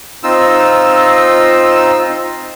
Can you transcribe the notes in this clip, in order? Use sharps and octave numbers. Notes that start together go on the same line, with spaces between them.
C4 D#4 F4 E6